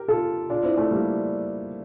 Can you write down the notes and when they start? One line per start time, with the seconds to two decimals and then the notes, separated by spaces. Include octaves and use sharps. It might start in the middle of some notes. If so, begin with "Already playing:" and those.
Already playing: G4 A#4
0.08 F4 A4
0.50 D4 F4
0.63 C4 E4
0.77 A3 C4
0.91 G3 A#3